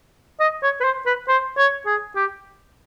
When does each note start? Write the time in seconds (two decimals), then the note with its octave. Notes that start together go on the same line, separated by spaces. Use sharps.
0.40 D#5
0.63 C#5
0.81 B4
0.84 C5
1.06 B4
1.28 C5
1.58 C#5
1.86 G#4
2.16 G4